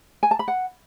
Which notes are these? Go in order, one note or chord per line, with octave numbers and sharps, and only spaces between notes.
G#5
A5
B5
F#5